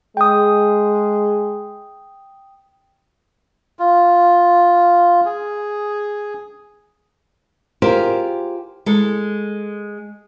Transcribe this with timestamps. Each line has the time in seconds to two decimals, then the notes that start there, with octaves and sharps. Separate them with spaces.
0.17 G#3 G5 D#6
3.79 F4
5.26 G#4
7.82 F4 G4 G#4 A#4 C5
8.86 G#3 A4